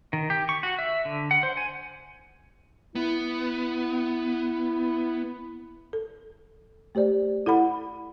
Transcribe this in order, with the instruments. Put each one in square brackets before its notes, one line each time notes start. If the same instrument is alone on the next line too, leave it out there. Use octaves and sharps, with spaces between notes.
[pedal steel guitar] D#3
G4
C#6
F#4
E5
D3
F#5
C5
G#5
[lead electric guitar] B3 [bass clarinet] E4
[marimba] A4
A3 G4 C5 D5
E4 A4 F#5 B5